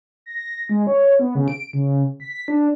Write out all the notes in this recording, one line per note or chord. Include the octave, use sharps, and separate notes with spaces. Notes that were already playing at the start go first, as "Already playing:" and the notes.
A#6
G#3
C#5
B3
C#3
D7
C#3
B6
D4